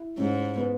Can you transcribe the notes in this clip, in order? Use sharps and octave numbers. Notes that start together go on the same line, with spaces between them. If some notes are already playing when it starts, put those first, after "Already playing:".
Already playing: E4
G#2 C#4
B3